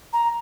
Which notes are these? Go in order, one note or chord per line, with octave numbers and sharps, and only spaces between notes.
A#5